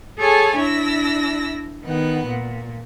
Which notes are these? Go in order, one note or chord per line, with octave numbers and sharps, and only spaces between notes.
G#4 A4 C#5 G#5 A5
D4 E4 E6 A#6
D#3 B3 F#5
A#2